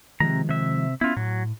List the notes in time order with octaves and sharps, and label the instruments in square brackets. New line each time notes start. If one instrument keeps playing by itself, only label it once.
[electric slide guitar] C3 A#5 [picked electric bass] D#3 F3 G#3
[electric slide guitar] C3 E5
[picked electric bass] B3 C#4 [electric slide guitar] E4 F4
[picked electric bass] A2 [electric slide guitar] F#3